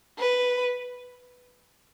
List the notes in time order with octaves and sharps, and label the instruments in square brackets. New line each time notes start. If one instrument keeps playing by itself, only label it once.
[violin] B4